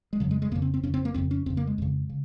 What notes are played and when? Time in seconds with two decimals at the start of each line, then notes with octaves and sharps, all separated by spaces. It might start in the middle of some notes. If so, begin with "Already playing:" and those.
0.13 G#3
0.20 F2 C#3 F#3
0.31 G#3
0.42 G#3
0.52 F2 C#3 A#3
0.62 C4
0.74 C4
0.83 F2 C#3 C#4
0.94 C4
1.05 A#3
1.14 F2 C#3 C4
1.31 C#4
1.46 F2 C#3 C4
1.57 A#3
1.67 G#3
1.78 F2 C#3
2.09 C#3